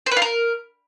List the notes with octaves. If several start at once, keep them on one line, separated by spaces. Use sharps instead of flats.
C5
B4
F4
A#4